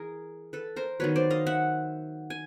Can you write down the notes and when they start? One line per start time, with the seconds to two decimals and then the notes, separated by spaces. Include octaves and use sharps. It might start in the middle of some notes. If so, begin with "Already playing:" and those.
Already playing: E3 G#4 A#4
0.53 A4 B4
0.76 A#4 C5
1.00 D#3 F#3 B3 B4 C#5
1.16 C5 D5
1.30 D#5 F5
1.46 E5 F#5
2.30 G#5